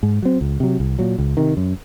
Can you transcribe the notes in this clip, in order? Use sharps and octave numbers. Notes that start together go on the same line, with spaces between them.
G#2
F#3 C4
C#2
C3 F#3
C2
A#2 F#3
C#2
C3 D#3
F#2